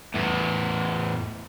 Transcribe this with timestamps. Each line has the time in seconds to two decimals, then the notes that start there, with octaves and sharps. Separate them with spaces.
0.15 E2 A2